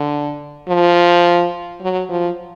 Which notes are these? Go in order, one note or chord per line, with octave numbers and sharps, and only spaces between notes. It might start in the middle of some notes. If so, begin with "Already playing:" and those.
Already playing: D3
F3
F#3
F3